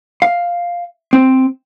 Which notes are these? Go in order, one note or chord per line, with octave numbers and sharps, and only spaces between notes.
F5
C4